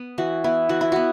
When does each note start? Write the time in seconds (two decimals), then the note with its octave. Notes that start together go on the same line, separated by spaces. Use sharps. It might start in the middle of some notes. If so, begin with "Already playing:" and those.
Already playing: B3
0.18 E3 F#4
0.44 B3 E4
0.69 E3 F#4
0.81 E4
0.92 B3 F#4